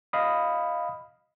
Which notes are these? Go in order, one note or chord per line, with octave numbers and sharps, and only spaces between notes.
D#5 F5 B5 D#6